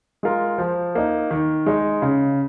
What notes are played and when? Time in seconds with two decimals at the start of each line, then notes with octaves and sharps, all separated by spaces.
0.23 G#3 F4 A#4
0.58 F3
0.95 A#3 D#4
1.31 D#3
1.66 G#3 D#4
2.02 C#3